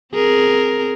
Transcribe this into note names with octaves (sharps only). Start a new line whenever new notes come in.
C4 G#4 A#4